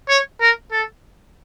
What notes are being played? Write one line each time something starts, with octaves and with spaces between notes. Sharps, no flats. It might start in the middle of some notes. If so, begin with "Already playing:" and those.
C#5
A#4
A4